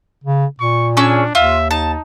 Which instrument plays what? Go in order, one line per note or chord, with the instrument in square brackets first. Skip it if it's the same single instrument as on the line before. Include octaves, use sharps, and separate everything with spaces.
[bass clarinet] C#3
[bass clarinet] A#2 [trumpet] C#6
[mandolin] C#4 G#4 E6 [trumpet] D4
[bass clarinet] D#2 [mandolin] F4 [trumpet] E5
[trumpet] D#4 [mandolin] A5